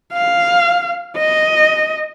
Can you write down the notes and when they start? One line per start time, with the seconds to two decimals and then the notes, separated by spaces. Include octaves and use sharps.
0.13 F5
1.18 D#5